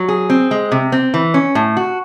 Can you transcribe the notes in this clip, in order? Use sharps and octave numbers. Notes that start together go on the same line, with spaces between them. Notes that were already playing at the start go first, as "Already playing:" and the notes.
Already playing: F#3
G#4
C4
G#3
C3
C4
E3
C#4
A2
F#4